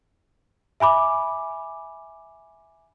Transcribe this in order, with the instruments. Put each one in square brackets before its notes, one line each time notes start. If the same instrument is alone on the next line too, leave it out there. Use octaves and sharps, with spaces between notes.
[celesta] E5 G#5 B5 D6